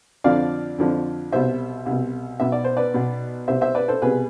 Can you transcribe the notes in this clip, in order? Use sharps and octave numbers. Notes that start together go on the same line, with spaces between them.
F2 D3 F3 D5 F5
F2 D3 F3
C2 B2 C5 E5
C2 B2
B1 B2 E5
D5
C5
B4 D5
B1 B2
C2 B2 C5 E5
C5 E5
B4 D5
A4 C5
C2 B2 G#4 B4